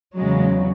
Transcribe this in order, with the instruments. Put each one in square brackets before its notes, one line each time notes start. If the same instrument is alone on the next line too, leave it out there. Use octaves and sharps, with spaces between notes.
[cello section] E2 C#3 F#3 G#3